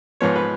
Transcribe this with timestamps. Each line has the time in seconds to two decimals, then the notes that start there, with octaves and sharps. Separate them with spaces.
0.21 G#2 F3 B3 C#5
0.36 B4